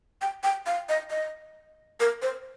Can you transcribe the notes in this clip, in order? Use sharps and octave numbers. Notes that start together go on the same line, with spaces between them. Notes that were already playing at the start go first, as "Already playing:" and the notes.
G5
G5
F5
D#5
D#5
A#4
C5